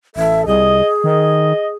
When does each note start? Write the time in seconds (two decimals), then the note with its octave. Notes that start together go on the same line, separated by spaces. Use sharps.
0.16 A1 A4 E5
0.47 C2 G#4 D#5
1.04 D#3 D#5